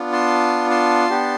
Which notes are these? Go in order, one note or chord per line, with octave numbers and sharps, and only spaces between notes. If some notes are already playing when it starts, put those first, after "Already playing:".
Already playing: B3 D4 F4
A5 C6
A5 C6
B3 D4 G4